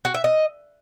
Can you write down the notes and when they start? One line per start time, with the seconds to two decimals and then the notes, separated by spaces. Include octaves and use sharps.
0.05 F#4
0.14 E5
0.24 D#5